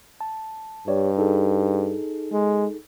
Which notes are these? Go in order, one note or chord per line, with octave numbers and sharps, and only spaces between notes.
A5
G2 G4 C#5 D5
D#4 G#4 A4
G#3